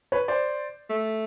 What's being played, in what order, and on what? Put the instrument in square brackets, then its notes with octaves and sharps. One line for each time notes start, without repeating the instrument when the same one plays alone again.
[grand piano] B4 C#5
C5 D5
[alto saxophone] A3